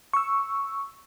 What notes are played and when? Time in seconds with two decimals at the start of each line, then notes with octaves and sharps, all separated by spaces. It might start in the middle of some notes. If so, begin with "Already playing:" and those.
0.13 C#6 E6